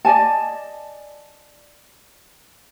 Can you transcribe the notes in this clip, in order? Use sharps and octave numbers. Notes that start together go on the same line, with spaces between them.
D5 D#5 G#5 A5